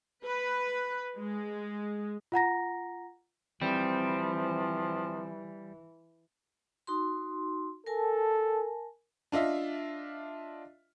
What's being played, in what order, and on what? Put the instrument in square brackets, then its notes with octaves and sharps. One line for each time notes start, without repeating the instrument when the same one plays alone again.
[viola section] B4
G#3
[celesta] F4 F#5 A#5 A#6
[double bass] E3 [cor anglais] F3 [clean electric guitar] G3 [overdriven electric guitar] C4
[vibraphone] D#4 F#4 C6
[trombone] A4 [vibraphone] A#4 G#5 A5
[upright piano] D4 F4 D#5 E5